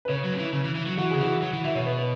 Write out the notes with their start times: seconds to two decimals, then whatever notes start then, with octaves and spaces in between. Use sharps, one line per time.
0.05 B4
0.08 C#3 C#5
0.24 F#3
0.34 C#3
0.38 E3
0.53 C#3
0.64 E3
0.75 E3
0.86 F#3
0.97 E3 F#4
1.11 C#3 G#4
1.20 E3 F#4
1.42 F#3
1.53 E3
1.65 E3 E5
1.75 B2 C#5
1.86 B4
1.98 B4